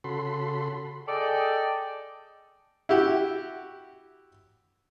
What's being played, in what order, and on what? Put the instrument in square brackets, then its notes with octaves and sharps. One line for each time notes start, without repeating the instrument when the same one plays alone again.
[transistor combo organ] C#3 F#4 A4 B5 C6
[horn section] G#4 A4 D5 D#5 G5
[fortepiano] E4 F#4 G4